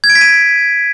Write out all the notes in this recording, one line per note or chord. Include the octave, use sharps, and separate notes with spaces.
G#6
D7
B6
D#7